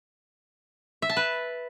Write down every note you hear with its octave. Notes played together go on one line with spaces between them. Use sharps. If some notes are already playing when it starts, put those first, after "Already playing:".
E5
A5
B4